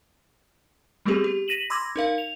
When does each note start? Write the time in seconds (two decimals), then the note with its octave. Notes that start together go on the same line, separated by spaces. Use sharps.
1.06 G3 A3 B3 C4 G4 G#4
1.24 G4
1.48 A#6 B6 D#7 E7 F#7
1.70 B5 C6 D6 E6 G#6 A#6
1.96 D#4 A#4 F5
2.18 F7